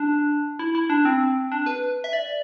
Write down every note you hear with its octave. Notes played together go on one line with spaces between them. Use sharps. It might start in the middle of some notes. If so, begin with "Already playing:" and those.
Already playing: D4
E4
E4
D4
C4
D4
B4
E5
D5